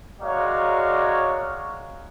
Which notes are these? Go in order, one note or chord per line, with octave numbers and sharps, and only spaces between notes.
G#3 F#4 A#4 C#5 D5 F5